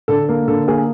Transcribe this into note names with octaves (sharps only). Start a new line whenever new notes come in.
D3 A4
A#3
D3 A4
A#3 G#4